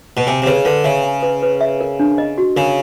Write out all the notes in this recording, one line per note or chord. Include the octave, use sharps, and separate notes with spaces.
B2
C3 G#5
C3
C#3 B4
D3 B4
C#3 E5
G#5
B4
B4
E5
A#4
D4
D#5
F#4
C#3 A#4